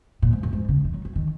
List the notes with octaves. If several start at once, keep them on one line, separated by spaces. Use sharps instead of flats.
A#2
G#2
F#2
G#2
C#3
D#3
F#3
F#3
D#3